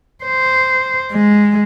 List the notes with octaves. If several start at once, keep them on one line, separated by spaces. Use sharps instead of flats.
C5
G#3